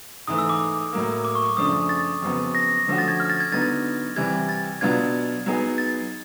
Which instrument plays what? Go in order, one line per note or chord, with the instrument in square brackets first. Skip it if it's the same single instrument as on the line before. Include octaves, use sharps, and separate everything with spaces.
[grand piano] G#2 E3 A3 [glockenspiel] D#6
[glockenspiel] E6
D6
[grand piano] A2 F#3 A#3
[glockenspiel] D6
C#6
D6
[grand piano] F#2 C#3 F3 A3 D4 [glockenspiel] D#6
[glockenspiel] A6
[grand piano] F2 C#3 F#3 B3
[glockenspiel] A#6
[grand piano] D3 F3 A3 C#4 F#4
[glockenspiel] A6
G#6
F6
A6
G#6
[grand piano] D3 F#3 B3 D#4 [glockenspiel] A6
[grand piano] C3 E3 G3 [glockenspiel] G#6
[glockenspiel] A6
[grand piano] B2 F#3 B3 D4 F4 [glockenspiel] G#6
[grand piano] F#3 B3 D#4 G#4
[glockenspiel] A6